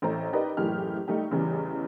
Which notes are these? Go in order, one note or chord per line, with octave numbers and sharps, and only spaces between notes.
A1 A2 A3 C5 A#5
D#4 G4 A#4 B4 D5 D#5
F#1 A2 E3 G4 F6
G3 A3 D#4 G4
A1 E2 C#3 E3 G3